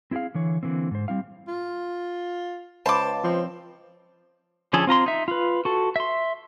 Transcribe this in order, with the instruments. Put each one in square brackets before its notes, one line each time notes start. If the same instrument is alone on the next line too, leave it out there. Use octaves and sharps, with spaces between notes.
[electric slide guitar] C4 E4 F#4 G#4 F5
D3 E3 C#5
D3 E3 A#3 C4
G#2 C5
G3 C4 E4 F5
[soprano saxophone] F4
[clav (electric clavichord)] C#2 B4 [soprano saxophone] C5 [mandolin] A5 D6
[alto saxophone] F3 [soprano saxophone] C4
[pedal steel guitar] D3 F3 C#4 G#4 A4
C4 F4 A#5 C6
D#4 E5
F4 B4
F#4 A4
E5 C6